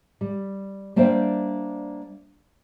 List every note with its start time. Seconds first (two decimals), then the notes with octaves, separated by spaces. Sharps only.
0.21 G3
0.96 G3 A#3 D4 C5 E5 G5